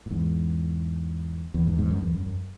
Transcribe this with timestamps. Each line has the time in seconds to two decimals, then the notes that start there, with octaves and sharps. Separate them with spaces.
0.06 A2
0.11 E2 G#2
1.54 E2
1.66 E2 G#2
1.78 E2 G#2
1.90 F#2
2.03 E2
2.15 F#2
2.26 F#2